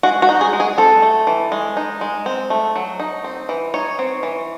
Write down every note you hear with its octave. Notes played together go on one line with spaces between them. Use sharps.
G#3 F#4
F#4
D#4
G#4
G#3
G#4
C4 A4
A3
E3
G#3
D#4
G#3
C4
A3
F#3
D#4
C4
E3
D#4 C#5
C4
E3